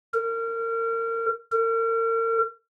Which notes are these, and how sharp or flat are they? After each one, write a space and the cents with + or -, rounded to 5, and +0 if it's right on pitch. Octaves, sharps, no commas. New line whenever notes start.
A#4 -30
A#4 -40